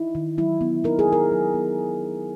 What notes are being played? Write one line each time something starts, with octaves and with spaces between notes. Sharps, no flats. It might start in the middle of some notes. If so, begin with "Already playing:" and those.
Already playing: D#4 E4
D#3
F#3 E4
B3
D#4 A#4
G#4
D#3 A#4
F#3
B3